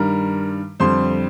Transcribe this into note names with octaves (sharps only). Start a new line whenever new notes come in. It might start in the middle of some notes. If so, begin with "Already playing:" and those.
Already playing: G2 D#3 G3 A#4
F2 D3 G3 C5 C6